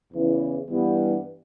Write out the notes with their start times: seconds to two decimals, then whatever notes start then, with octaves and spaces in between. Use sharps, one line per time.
0.13 E2 C#3 E3
0.69 G2 E3 G3 B3